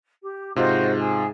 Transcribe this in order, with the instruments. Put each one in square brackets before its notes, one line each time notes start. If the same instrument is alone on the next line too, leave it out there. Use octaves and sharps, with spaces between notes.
[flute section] G4
[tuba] G#2 [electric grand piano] C3 F4 [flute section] F#4 C5 D#5
[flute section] G#4